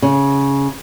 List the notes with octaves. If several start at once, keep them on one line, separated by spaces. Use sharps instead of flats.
C#3